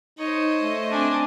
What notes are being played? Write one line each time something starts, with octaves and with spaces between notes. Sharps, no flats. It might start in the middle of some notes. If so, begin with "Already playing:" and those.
D#4 C5 C#5 D#5
A3
C4 D4 G#5